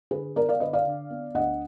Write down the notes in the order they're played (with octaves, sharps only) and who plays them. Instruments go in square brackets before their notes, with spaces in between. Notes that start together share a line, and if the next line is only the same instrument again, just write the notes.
[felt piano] D3 G#4 B4
B3 A#4 D5
D5 F5
D3 B4 D#5
D5 F5
D3
B3
D2 D#5 F#5